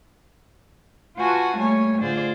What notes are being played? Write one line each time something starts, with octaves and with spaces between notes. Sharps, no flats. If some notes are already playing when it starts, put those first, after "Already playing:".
F4 F#4 B4 F#5 G#5 A5
G3 A3 A#3 C#5 G#5
A2 D3 F4 G#4 C5 D5